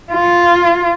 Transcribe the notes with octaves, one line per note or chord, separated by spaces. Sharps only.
F4